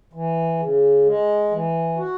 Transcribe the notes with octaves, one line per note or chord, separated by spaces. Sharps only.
E3
C#3
G#3
E3
F#4